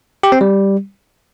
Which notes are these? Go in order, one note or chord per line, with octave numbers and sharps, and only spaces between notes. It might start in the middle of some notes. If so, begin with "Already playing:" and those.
G4
C4
G3